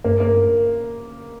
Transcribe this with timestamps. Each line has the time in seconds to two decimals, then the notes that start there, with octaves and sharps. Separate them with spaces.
0.04 G2 A#3
0.20 A#3